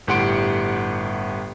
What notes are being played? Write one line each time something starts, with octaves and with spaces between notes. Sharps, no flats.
G1 A2 G4 F#5 C6 D7